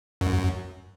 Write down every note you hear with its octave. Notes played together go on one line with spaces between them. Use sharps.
F#2